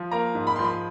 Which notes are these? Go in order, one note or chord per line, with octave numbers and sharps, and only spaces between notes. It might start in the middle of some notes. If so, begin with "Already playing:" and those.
Already playing: F3
A#3 A#5
G#2
B5
F3 C6
B5